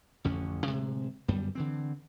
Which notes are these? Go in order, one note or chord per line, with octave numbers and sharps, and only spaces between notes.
A1 F2 D3 C#4
D1 C3 G#3
G1 F#2 G3 B3
D3 E3 C4